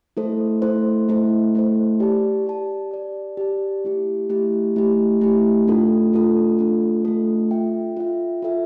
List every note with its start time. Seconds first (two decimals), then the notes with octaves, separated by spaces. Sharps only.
0.17 A3 E4 A4 C5
0.62 A3 E4 A4 C5
1.09 A3 E4 A4 C5
1.55 A3 E4 A4 C5
2.00 G4 D5 A5
2.46 G4 D5 A5
2.91 G4 D5 A5
3.37 G4 D5 A5
3.84 A3 E4 G4
4.30 A3 E4 G4
4.76 A3 E4 G4
5.21 A3 E4 G4
5.67 A3 D4 F4 A4
6.13 A3 D4 F4 A4
6.59 A3 D4 F4 A4
7.05 A3 D4 F4 A4
7.51 F4 A4 E5 G5
7.97 F4 A4 E5 G5
8.42 F4 A4 E5 G5